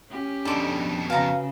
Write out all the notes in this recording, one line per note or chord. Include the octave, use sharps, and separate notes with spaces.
C#4 G4
F2 B2 D4 D#4 A4 D6
C#3 F#4 B4 F5 G#5 A#5